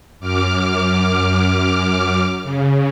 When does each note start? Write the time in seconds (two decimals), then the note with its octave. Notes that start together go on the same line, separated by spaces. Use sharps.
0.20 F#2 D6 F6
2.44 C#3